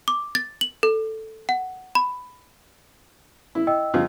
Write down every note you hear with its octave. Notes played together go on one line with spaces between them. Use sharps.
D6
A6
F#7
A4
F#5
B5
E4
D#5 G5 E6
C#3 F3 F4